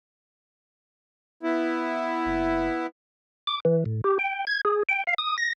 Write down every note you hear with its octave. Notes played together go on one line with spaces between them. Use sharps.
B3 E4
F#1
D6
E3
A2
G4
G5
G#6
G#4
G5
F5
D#6
A#6